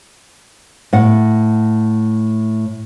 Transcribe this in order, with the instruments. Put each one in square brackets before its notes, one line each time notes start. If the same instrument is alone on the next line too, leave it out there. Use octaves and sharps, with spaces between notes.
[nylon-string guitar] A2 F#5